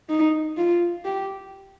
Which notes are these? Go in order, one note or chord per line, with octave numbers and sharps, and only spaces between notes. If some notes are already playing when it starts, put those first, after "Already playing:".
D#4
F4
G4